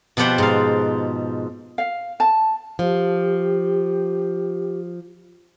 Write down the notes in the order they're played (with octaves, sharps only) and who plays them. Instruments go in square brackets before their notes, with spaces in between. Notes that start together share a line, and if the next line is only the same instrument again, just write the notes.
[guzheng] B2 F3 G4 C5 F#5 B5
G#2 F5
[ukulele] F5
A5
[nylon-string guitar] F3 [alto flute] G4